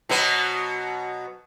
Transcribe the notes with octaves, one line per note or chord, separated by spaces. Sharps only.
B2 F#3 B3